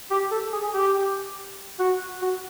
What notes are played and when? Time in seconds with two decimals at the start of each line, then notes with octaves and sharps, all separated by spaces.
0.10 G4
0.31 A4
0.53 G#4
0.73 G4
1.79 F#4
2.22 F#4